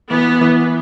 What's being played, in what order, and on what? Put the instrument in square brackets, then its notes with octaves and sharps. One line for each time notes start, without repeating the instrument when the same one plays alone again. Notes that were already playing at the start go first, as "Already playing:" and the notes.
[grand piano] E3 [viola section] B3
[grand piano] E3